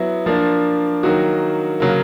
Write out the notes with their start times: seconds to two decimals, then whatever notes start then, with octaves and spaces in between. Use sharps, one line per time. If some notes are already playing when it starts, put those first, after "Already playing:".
Already playing: F#3 B3 E4
0.26 F3 A#3 D4
1.03 D#3 F#3 A#3 D#4 F#4
1.80 C#3 F#3 A#3